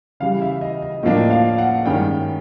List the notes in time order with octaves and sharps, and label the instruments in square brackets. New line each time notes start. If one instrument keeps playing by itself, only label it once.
[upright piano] C#3 E3 G3 F5
E5
D#5
D#5
A2 F3 A#3 D4 D#5
F5
F#5
G2 D#3 G#3 C#4 G5